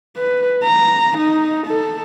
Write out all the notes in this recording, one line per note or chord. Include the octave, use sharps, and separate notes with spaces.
B4
A#5
D#4
A4